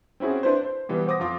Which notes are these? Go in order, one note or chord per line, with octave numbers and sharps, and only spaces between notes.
C4 C#4 E4 F#4 G#4
D4 E4 B4 C5
C5
B2 E3 G3 B3
C5 F#5 D6 D#6 A#6
F2 F4 D6 D#6